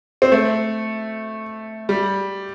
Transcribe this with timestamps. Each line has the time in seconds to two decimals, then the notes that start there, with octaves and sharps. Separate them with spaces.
0.22 C4
0.32 A3
1.89 G3